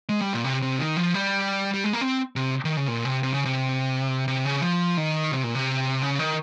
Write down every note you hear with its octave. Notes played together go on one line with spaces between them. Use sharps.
G#3
G3
A#2
C3
C3
D#3
F3
G3
G3
G#3
A#3
C4
C3
D#3
C#3
A#2
C3
C3
C#3
C3
C3
C#3
F3
D#3
C3
A#2
C3
C#3
D#3